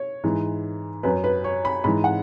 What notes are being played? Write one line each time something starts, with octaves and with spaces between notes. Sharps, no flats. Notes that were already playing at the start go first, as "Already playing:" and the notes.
Already playing: C#5
G#2 E3
F#2 F#3 B4
B4
C#5
B5
G#2 E3 B5
F#5